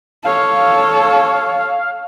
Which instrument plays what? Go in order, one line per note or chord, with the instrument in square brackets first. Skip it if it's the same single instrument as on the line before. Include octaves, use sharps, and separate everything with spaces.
[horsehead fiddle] A4 C#5 [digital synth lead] F5